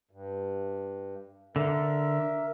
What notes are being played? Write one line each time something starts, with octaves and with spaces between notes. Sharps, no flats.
G2
D3 A#4 E5